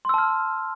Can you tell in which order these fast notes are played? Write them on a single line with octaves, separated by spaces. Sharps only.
C6 E6 A5 F6